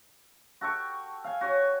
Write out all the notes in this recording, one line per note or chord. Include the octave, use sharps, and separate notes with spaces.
F#4 A4 G5 C#6
F5 G#5
F#4 C#5 G#5